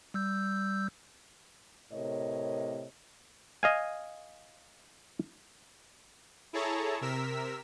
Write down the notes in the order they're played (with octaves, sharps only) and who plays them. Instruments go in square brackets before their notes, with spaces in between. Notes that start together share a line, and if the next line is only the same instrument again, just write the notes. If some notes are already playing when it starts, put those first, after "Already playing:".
[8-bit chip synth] G3 E6 G6
[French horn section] A2 C3 A#4 C#5 D#5
[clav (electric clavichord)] D#5 F5 G#5
[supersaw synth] E4 G#4 A4 C#5 A5 A#5
C3 A#4 E6 B6